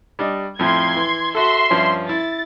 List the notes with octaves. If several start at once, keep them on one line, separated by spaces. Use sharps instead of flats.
G3 D4 D#5
F2 A2 F3 C6 G#6
E3
F#4 A4 E5 C6
G2 F3 C#4
E4 A6